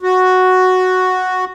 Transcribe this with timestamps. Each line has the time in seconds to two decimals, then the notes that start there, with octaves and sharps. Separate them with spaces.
0.03 F#4